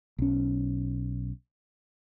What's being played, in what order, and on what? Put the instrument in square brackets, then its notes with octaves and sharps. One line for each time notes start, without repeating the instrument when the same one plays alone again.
[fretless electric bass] B1 C#4